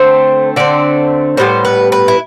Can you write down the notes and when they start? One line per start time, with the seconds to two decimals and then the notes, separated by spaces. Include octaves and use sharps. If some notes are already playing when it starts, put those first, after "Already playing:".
Already playing: D3 A3 C4 C5
0.56 D3 A3 C4 D5
1.37 A2 G3 B3 C5
1.65 B4
1.92 B4
2.08 E4